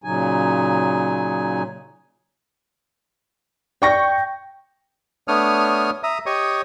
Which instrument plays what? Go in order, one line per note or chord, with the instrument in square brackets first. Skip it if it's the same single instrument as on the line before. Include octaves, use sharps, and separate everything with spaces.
[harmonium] A#2 C#3 F#3 D#4 G#5
[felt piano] D5 C#6 A#6 [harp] G5
[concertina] A3 B3 D4 C#5 D#6 F6
E5 A#5 D#6
G4 C#5 D#5 C#6 D#6